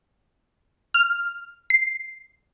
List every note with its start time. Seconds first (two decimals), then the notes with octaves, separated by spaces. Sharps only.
0.94 F6
1.70 C7